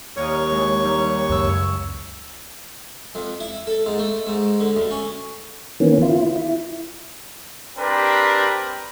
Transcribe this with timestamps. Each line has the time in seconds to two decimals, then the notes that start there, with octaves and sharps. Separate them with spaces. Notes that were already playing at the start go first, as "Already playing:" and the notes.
0.17 D#2 G3 A#4 C#5 C#6 D#6
0.52 E3 G#3
0.83 G3 D#4
1.29 C#2 F#2 E6
3.15 F2
3.40 E4
3.67 A4
3.86 G#2
3.99 A3
4.27 G#2
4.60 D3
4.76 D2
4.91 C#4
5.80 D#3 E3 A#3 B3 C#4
6.02 E4 F4
6.36 E4
7.78 C4 D4 G4 A#4 B4